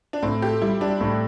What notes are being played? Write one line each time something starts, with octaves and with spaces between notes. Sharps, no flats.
D4
A2 C4
G4 A4
G3 E4
G3 D4
A2